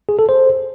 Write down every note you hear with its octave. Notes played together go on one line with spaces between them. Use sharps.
G#4
A4
C5